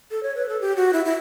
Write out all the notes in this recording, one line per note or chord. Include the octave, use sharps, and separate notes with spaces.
A4
C#5
B4
A4
G4
F#4
E4
E4